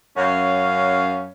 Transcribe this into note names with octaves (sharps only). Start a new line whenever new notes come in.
F#2 C#4 F5